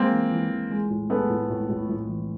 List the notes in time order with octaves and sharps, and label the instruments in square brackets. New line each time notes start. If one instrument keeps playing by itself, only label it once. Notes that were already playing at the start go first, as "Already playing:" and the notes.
Already playing: [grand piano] G#3 [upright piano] A#3 C4
[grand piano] E3
E3
E3
G#3
A2
[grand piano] G#3 [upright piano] A3 B3
[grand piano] A2
A2
A2
A2
E3